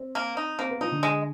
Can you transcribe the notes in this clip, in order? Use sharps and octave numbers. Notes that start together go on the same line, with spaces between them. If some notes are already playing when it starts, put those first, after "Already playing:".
Already playing: C4
A#3
D#4
A#3 C4
B3
F3 D#4
D3
G#3